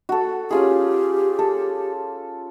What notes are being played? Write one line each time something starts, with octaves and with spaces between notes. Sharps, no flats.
F#4 A4
C#4 F4 G4 G#4
A4